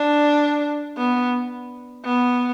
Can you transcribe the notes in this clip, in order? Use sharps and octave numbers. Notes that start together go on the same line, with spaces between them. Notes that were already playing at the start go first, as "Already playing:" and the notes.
Already playing: D4
B3
B3